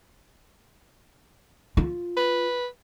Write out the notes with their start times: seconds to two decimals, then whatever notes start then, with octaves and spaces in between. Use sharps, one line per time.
1.77 F4
2.17 B4